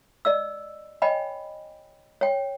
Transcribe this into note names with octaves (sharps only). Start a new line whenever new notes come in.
D5 D#5 E6
C#5 D#5 G5 G#5 B5
C#5 G5